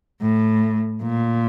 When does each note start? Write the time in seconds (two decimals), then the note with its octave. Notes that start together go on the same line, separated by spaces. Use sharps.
0.22 A2
1.03 A#2